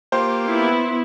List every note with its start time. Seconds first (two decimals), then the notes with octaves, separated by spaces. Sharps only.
0.12 A#3 F4 G4 C5
0.46 B3 E4